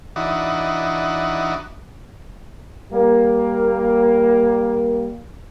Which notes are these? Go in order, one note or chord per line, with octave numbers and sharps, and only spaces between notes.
E3 D4 D#4 F#4
G3 A#3